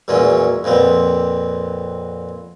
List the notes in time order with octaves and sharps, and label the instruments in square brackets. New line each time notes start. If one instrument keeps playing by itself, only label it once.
[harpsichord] E2 A#2 F#3 G#3 C#4
F2 A#2 B3 C4